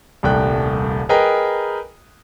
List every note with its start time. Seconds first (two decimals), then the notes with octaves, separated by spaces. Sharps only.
0.23 D#1 C2 A3 G5 F#6
1.09 G#4 A#4 B4 D#5 G5 A#5